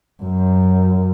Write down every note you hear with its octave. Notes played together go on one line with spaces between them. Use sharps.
F#2